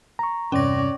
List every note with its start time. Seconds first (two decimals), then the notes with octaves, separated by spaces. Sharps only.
0.19 A#5 C#6
0.52 E2 G2 C3 C#4 C#5 D5 A#6